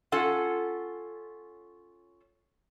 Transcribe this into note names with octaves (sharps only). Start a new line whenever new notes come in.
C#4 F4 A4 F#5